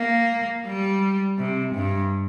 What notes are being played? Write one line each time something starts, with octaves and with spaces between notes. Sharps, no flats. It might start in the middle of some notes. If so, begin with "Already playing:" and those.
Already playing: A#3
G3
C3
G2